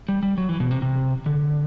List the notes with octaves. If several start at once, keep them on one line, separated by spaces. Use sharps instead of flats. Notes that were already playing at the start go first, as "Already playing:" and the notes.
G3
G3
F#3
E3
B2
C3
C3
D3